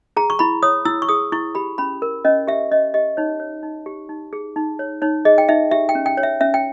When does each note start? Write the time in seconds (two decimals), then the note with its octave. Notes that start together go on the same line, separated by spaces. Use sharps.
0.17 G#4 A#5
0.30 C#6
0.39 E4 B5
0.63 C#5 D#6
0.85 E4 E6
1.02 C#6
1.09 G#4 D#6
1.32 E4 C#6
1.55 G4 B5
1.78 C#4 B5
2.02 A#4
2.25 C#4 D#5
2.47 G4 E5
2.71 C#4 D#5
2.94 G4 D#5
3.17 D#4 C#5
3.40 C#5
3.63 D#4
3.86 G4
4.09 D#4
4.33 G#4
4.56 D#4
4.79 C#5
5.02 D#4 C#5
5.25 G#4 D#5
5.38 G5
5.49 D#4 E5
5.71 G4 E5
5.89 G5
5.95 C#4
6.06 G5
6.17 C#5
6.23 E5
6.41 C#4 E5
6.54 G5